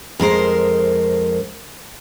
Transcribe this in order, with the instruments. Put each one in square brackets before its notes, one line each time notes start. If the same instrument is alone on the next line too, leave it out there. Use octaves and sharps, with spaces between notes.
[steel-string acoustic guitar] F2 G#3 A#4 C5